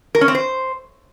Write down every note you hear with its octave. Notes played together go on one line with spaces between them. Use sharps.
A#4
C#4
C4
C5